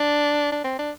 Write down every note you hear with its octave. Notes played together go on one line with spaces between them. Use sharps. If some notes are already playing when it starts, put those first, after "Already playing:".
Already playing: D4
D4
C4
D4